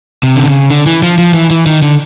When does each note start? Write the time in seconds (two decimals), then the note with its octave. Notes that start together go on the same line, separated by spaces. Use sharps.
0.23 C3
0.36 D3
0.48 C#3
0.70 D3
0.86 E3
1.03 F3
1.18 F3
1.34 E3
1.50 E3
1.66 D#3
1.82 D3